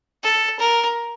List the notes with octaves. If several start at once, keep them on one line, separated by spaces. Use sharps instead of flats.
A4
A#4